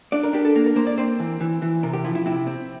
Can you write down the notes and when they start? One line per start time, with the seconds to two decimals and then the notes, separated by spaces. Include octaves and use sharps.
0.12 D4 D5
0.23 A#4
0.33 D4 G4
0.45 A4
0.55 A#3 A#4
0.66 A#4
0.76 A#3 C5
0.87 D5
0.98 C4 C5
1.19 E3
1.41 E3
1.62 E3
1.83 C3 A#4
1.93 G4
2.04 F3 E4
2.15 E4
2.26 C3 E4
2.47 C4